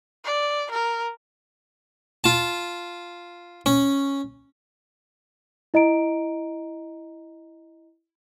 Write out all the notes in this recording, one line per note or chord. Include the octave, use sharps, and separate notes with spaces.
D5
A#4
F4 A5
C#4
E4 D#5 A#5 D7